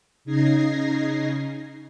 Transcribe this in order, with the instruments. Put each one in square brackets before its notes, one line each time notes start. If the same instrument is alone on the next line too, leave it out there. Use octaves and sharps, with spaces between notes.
[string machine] C#3 D#4 G#6 A#6 C7